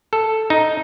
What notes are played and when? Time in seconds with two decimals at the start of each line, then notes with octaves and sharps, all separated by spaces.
0.13 A4
0.50 D#4